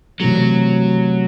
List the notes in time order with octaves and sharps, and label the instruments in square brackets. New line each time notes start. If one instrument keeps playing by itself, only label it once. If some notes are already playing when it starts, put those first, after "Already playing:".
[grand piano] C3 E3 A3 [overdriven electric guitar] F#3